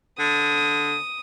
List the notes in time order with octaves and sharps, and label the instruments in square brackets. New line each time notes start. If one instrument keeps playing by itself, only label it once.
[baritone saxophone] D3 [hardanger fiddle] D#6